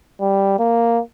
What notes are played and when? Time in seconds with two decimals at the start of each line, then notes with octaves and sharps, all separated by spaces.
0.21 G3
0.59 A#3